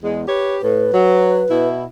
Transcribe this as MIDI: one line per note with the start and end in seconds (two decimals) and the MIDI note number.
0.02 0.22 40
0.02 0.22 56
0.27 0.57 67
0.27 0.57 71
0.27 0.57 73
0.62 0.87 45
0.62 1.68 71
0.92 1.44 54
1.50 1.84 47
1.50 1.84 64